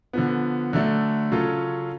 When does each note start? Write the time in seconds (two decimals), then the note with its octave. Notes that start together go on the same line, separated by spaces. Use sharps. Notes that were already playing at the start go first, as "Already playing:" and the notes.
0.13 D3 F3 B3
0.73 D3 F#3 A3 D4
1.32 C#3 F#3 C#4 F4 A4